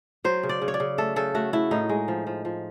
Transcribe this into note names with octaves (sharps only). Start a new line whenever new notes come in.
F#3 C5
C#3
D5
C#3
C#5
D5
C#3
A3 A4
C#3 A4
A3 F#4
A3 E4
A2 D#4
G#3
F3
F3
F3